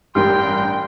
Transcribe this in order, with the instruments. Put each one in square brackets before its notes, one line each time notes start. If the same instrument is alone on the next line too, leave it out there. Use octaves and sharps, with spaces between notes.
[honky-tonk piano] A1 G2 A#4 [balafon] G4 [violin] G5 [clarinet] C6